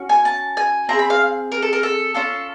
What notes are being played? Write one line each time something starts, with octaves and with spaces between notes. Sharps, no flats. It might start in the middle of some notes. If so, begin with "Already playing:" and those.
Already playing: C#4 F#4
G#5
A5
G#5
C4 E4 G#4 A#5
B5
F5
A#4
A4
A#4
A4
C#4 F4 A4